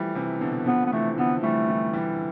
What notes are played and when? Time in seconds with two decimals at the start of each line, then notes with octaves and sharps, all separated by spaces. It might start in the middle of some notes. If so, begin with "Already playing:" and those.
Already playing: E3 F3 G3 A3
0.15 C3 E3
0.41 B2 D3
0.66 D3 F3 B3
0.86 B3
0.92 C3 E3 A3
1.17 D3 F3 B3
1.43 E3 G3 A3
1.68 E3 G3
1.93 E3 G3